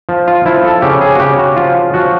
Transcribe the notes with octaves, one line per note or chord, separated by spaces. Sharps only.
F3
F4
F3 E4
A4
C#3 G4
G#4
F#4
C#3 G4
F#4
F3 F4
F3 F#4